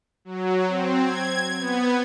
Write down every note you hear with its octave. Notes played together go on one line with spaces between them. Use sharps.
F#3
C4
G#6
B3